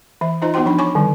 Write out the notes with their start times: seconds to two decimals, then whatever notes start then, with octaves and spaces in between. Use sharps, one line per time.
0.21 E3 E5
0.42 D#4 F4 C5 D#5 A#5
0.54 B3 D#4 F#4 C5 G5 C6
0.66 F3 D4 D#4 B5
0.78 C#5 G#5 B5 C#6 D6
0.95 D3 D#3 G3